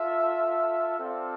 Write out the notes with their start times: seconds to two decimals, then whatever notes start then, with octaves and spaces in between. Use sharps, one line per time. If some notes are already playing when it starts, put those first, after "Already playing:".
Already playing: F4 A4 E5
0.98 C4 F4 A4 D5 F5